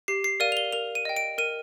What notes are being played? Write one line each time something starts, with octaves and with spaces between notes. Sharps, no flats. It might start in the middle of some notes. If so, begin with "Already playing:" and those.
G4 C7
C7
A#4 D5 F5 D#7
F7
G7
A#4 F7
D#7
D#5 G5
D7
A#4 D#7